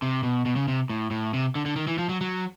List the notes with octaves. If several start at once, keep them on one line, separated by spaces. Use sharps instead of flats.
C3
B2
B2
C#3
C3
A2
A2
C3
D3
D3
D#3
E3
F3
F#3
F#3